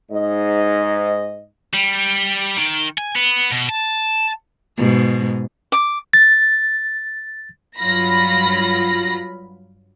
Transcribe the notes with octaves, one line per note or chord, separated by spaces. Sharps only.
G#2 D#5
G3
D#3
G#5
B3
B2
A5
G#2 B2
D6
A6
G2 F#3 F4 B5 A#6